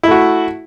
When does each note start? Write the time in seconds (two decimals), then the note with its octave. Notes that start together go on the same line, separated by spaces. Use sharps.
0.03 E4
0.07 A3
0.11 F#4